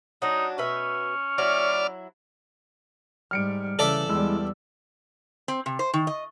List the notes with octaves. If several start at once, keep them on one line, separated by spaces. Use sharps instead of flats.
F#3 D4 D#4
B2 C#4 B4 E5
F#3 E4 D5 F6
G#2 G3 F6 C#7 D7
C#3 E3 A4 D5 E5
E2 G3 G#3 E4 E6
C4
C3
C5
D#3
D#5